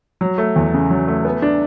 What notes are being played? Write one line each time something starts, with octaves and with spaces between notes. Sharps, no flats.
F#3
A3
E2
C#3
F#3
A3
B3
D4